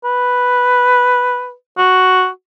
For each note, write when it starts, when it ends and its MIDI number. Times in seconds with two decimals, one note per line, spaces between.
0.04 1.53 71
1.78 2.28 66